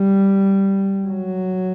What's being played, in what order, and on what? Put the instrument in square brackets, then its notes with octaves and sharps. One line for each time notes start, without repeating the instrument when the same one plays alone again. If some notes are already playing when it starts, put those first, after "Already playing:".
Already playing: [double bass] G3
F#3